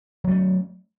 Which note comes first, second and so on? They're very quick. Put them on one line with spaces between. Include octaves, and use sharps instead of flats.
F#3 A3 C#4